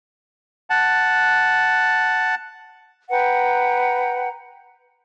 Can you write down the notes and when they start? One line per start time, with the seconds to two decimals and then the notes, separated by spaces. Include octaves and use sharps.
0.70 F#5 A5
3.10 B4 F#5 G5 A#5